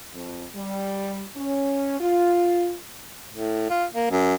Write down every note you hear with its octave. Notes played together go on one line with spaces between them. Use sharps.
F2
G3
C#4
F4
A2
F4
A#3
F#2